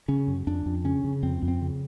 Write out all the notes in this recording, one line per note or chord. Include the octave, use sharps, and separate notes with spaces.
C#3 C#4
F#2
F2 D4
F2
C#3 C#4
C#3
F2 C4
F2
C4
C#3